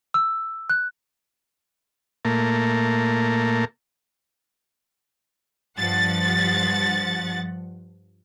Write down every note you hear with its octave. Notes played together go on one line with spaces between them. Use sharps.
E6
F#6
A#2 A3 A#3
G2 F3 F#5 A6